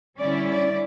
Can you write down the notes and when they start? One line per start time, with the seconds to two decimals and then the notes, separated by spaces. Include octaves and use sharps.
0.20 D3 G3 C#4 E4 D5
0.49 D5